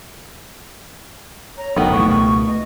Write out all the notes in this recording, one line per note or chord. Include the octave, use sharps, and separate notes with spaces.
C#5 A#5
F#1 F2 D#3 F#3 B3 A4
C2 A#2 E3 A3 C#6
C#2 B2 C#6
D#5